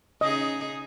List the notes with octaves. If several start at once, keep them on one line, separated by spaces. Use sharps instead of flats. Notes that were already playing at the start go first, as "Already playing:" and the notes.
C#3 D#4 G#4 D#5